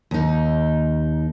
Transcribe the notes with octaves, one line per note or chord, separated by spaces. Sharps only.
D#2 D#4